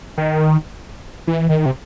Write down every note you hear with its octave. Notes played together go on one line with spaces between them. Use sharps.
D#3
E3
D#3
C3